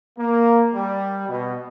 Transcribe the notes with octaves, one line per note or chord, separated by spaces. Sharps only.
A#3
G3
B2